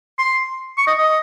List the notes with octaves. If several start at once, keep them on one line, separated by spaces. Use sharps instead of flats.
C6
C#6
D#5
D#5